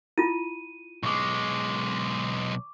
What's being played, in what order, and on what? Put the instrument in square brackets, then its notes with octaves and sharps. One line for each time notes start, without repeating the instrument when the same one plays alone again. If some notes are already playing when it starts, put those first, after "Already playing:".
[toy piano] E4 F4 [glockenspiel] D#7
[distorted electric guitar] B1 G#3 [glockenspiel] C#6 D6